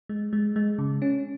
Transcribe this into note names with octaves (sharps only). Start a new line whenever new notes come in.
G#3
G#3
G#3
C#3
C#4